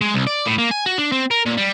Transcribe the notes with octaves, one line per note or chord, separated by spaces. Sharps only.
G#3
C2
D5
A2
A#3
G#5
F#4
D4
C4
A#4
A#2
G3